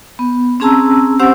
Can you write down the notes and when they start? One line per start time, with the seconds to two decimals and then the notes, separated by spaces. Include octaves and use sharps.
0.19 B3
0.60 C4 C#4 G#4 A5 A#5 E6
1.19 C4 C#4 G4 C5 F#5 E6